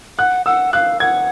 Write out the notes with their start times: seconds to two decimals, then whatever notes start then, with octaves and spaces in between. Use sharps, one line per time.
0.18 F#5 F#6
0.46 F#5 E6
0.73 F5 F#6
1.00 F#5 G#6